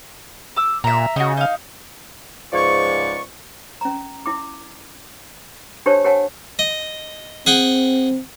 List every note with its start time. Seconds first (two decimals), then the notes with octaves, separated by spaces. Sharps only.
0.56 D6 E6
0.84 A#2 E5 A#5
1.16 C#3 D#4 F#4
1.37 D#4 F5
2.53 C#2 G#2 F3 D5 C#6
3.81 C#4 A#5
4.26 E4 D6
5.86 D4 G4 A#4 C5 C#5 A5
6.04 G4 A#4 C#5 F#5 G#5 A5
6.59 D#5
7.46 C4 G#4 F#5 G5